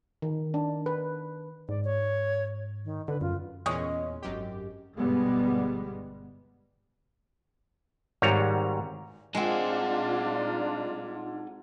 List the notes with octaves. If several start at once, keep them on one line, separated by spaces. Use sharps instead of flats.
D#3
D4
B4
G#2 D5
C#5
D#3
D3 B4
F#2 F4
E2 A#2 G#3 C#4 C#5 D#5
G#1 F#2 G4
G1 B2 G3 G#3 B3
G#1 G#2 G3 C#5 A#5
G#3 C4 D4 D#4 F4 F#5